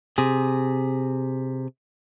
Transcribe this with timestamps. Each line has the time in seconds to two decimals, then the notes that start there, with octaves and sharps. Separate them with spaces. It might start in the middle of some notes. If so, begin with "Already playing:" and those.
0.18 C3 G#4